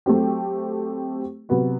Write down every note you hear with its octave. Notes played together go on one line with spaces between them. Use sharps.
F#3 A3 C4 G4
C3 F#3 B3 F#4